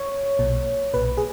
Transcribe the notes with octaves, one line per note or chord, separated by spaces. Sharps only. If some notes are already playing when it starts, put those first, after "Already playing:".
Already playing: C#5
B1 A#2
B1 A#2 B4
G#4